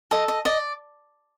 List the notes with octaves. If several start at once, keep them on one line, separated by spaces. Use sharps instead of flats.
A4 D#5
D#5
D5 D#5